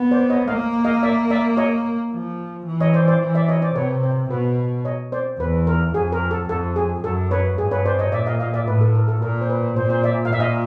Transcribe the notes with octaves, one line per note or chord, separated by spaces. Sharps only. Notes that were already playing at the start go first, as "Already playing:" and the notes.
Already playing: B3
C5 D5
C#5 D#5
A#3 D#5 F5
D#5 F5
D5 E5
D5 E5
C#5 D#5
F3
E3
C#5 D#5
C5 D5
C5 D5
E3
D5 E5
C#5 D#5
C5 D5
C3 B4 C#5
C5
B2 B4
C#5 D#5
C5 D5
E2 B4
A#4
F2 G#4
A#4
A4
F2 A4
G#4
F#2 A4
B4 C#5
G2 G#4
B4 C#5
C5 D5
C#5 D#5
A#2 D5 E5
D#5 F5
D#5 F5
D5 E5
A2 B4
A4
A#4
A4
A#2 A#4
C5
B4
A#2 C5
C5
D5 E5
F5
A#2 E5
D#5 F5